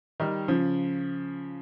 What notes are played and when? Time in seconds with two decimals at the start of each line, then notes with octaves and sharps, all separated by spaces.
0.20 D#3 G3
0.48 C#3 F3